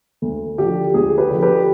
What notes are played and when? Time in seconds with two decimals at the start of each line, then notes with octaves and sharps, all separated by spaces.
0.22 D2
0.58 D3 F3 G4
0.94 D2 G#4
1.18 G4 B4
1.31 D3 F3
1.42 G4 B4